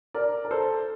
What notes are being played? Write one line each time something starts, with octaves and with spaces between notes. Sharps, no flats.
A#4 D5
A#4
A4 C5